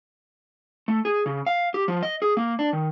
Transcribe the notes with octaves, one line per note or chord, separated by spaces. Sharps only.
A3
G#4
C#3
F5
G4
F3
D#5
G#4
A#3
D4
D#3